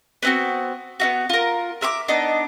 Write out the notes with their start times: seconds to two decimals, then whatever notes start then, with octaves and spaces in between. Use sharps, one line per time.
0.23 B3 C4 F#4
1.00 B3 E4 F#4
1.29 F4 A#4
1.81 A#4 E5 B5 D6
2.08 B3 D4 D#4 D#5